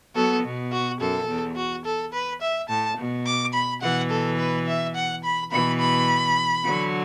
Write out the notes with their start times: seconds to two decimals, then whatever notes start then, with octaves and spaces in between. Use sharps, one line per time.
0.15 F#3 B3 A4
0.43 B2
0.72 F#4
0.99 F#2 A4
1.28 E2
1.56 F#4
1.85 A4
2.13 B4
2.42 E5
2.69 A2 A5
2.98 B2
3.26 D6
3.54 B5
3.82 B2 E3 F#5
4.10 A4
4.38 B4
4.67 E5
4.95 F#5
5.24 B5
5.51 B2 E3 B5
5.80 B5
6.65 D3 F#3